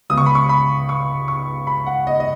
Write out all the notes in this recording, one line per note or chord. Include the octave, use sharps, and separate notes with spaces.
C#2 C#3 B3 D#6
C#6
B5
C#6
B5
C#6
C#6
B5
F#5
D#5
D#5